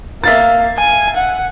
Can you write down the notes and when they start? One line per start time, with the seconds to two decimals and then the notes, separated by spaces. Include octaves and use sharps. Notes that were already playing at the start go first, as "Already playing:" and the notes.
0.24 A#3 E5 F5 A6
0.78 G#5
1.16 F#5